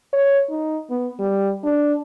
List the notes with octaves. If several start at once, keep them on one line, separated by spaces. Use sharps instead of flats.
C#5
D#4
B3
G3
D4